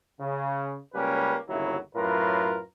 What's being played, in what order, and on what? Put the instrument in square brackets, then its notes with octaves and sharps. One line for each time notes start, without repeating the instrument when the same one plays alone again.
[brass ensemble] C#3
C#2 G3 A#3 C#4 G4 B4
G1 D#2 C#3 F#3 E4
F#2 A2 F4 A#4 B4